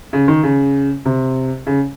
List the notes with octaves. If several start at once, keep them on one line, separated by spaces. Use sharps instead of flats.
C#3
D#3
C#3
C3
C#3